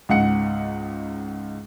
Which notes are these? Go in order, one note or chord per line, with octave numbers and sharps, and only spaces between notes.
C#2 G#2 F#5 C#7